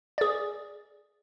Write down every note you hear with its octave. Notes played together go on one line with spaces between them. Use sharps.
G#4 D5